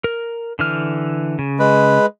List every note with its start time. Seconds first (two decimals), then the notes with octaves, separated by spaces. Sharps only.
0.04 A#4
0.59 D3 E3 F6
1.39 C#3
1.59 G#3 B4